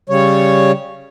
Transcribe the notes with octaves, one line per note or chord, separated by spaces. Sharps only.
C#3 G3 C#5